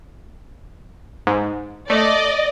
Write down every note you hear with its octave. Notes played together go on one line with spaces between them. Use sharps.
G#2
A3 D5 D#5